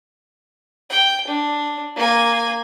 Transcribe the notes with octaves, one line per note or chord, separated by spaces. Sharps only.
G5
D4
A#3 G#5